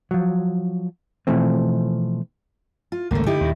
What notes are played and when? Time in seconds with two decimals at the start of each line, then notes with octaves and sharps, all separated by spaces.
0.11 F3 F#3
1.27 B2 E3 F3 A3 C4
2.92 F4
3.11 G#1 C#2 D3 A3 A#3
3.26 D3 D#4 E4 G4
3.41 D#2 A#2